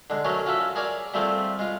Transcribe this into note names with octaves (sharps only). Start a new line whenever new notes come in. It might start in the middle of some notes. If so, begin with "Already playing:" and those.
D3 G#3
F#3 A3 C#4 A#4 C#5
C#4 F4 F#4 A4 E5
G#4 A#4 C#5 D5 G#5
G3 A3 C4 F4 G4 G#4
G#3 F4